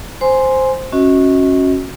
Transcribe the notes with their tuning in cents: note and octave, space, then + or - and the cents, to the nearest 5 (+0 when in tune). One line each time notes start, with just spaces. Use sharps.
C5 +0 G#5 +0 C6 +0
C#4 -15 F#4 -10 D#5 +35